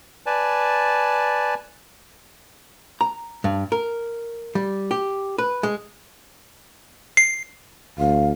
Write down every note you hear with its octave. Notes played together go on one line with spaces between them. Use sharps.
B4 D5 G#5 A5
A#5
G2
A#4
G3
G4
B4
G#3
C7
D2 F5